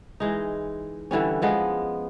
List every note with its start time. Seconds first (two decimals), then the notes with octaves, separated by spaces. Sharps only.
0.20 E3 G#3 D#4
1.11 D3 E3 G3 C#4
1.42 F3 G#3 B3